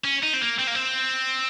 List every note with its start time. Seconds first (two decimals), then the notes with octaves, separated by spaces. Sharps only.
0.05 C#4
0.23 D#4
0.34 C4
0.41 A#3
0.59 C4
0.67 A#3
0.75 C4